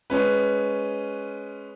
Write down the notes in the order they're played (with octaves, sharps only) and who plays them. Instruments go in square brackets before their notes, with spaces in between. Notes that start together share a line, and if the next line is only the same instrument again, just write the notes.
[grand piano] G#3 C#4 B4